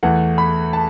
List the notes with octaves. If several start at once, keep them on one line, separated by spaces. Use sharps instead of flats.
E2 E3 A3 F#5
B5
A5